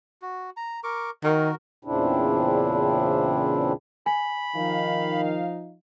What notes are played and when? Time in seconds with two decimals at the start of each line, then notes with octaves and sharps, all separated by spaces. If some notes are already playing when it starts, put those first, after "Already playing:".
0.22 F#4
0.57 A#5
0.84 A#4 C#6 D6
1.24 D#3 F#4 A#4
1.85 E2 A#2 C#3 C4 D4 E4
4.06 G#5 B5
4.56 D#3 F3 D#4 F5